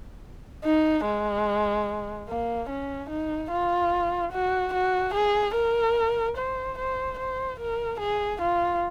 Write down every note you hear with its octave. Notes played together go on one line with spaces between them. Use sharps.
D#4
G#3
A#3
C#4
D#4
F4
F#4
F#4
G#4
A#4
C5
C5
C5
A#4
G#4
F4